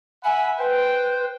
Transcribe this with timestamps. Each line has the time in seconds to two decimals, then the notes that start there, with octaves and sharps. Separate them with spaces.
0.24 E5 F#5 G#5 B5
0.58 B4 C5 G5